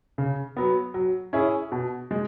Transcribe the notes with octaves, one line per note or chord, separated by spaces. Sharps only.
C#3
F#3 B3
F#3
C#4 E4 G#4
B2
G#3